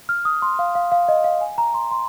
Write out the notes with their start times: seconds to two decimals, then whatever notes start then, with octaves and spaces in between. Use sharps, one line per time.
0.09 F6
0.25 D#6
0.42 C6
0.59 F5
0.75 F5
0.92 F5
1.08 D#5
1.24 F5
1.41 G#5
1.58 A#5
1.74 C6
1.92 C6